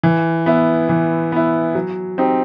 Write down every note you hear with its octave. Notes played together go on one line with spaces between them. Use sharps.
E3
B3 E4
E3
B3 E4
F#3
C4 D#4 G4